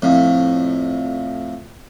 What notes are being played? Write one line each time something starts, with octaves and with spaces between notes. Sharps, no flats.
F2 A2